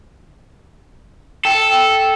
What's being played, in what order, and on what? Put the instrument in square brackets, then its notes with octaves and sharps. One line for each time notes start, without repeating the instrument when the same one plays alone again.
[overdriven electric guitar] A4 [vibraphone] G5